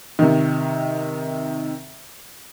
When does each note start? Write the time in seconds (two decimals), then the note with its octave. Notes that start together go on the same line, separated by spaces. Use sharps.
0.19 C3 D#3